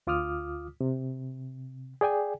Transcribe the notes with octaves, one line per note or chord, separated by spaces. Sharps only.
D2 F4 D6 D#6 F6
C3
G#4 D5 G5 G#5